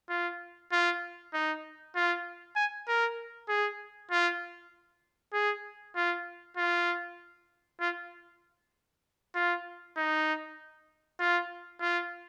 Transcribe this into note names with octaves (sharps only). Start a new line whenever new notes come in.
F4
F4
D#4
F4
G#5
A#4
G#4
F4
G#4
F4
F4
F4
F4
D#4
F4
F4